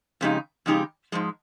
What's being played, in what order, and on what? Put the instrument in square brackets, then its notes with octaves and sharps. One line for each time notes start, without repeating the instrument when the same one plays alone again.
[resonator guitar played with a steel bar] F2 C#3 G#3 D#4 G4
F2 C#3 G#3 D#4 G4
G#2 F3 G#3